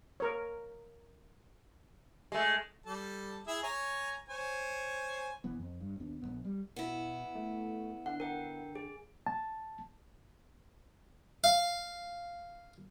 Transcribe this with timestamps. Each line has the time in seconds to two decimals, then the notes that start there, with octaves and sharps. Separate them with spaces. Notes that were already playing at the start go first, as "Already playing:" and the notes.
0.20 A#4 C#5
2.32 G#3 A3
2.86 G3 A4 A5
3.47 E4 G#4 E5
3.63 C#5 G#5 A#5
4.29 C5 C#5 G#5
5.44 E1 E3 B3
5.59 F2
5.80 G2
6.00 D#2 B3 D4
6.22 A#1 E2 B3
6.45 G3
6.76 B2 B3 E4
7.35 A3
8.06 D3 F#5
8.20 A#4 G5
8.75 G#4
9.27 A5
11.44 F5